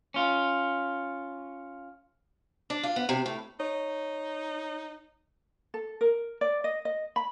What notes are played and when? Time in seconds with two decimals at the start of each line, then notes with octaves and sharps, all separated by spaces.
0.14 C#4 F4
2.70 D4
2.83 F4
2.96 B3
3.09 C3
3.26 A2
3.60 D#4 C#5
5.74 A4
6.01 A#4
6.41 D5
6.64 D#5
6.85 D#5
7.16 B5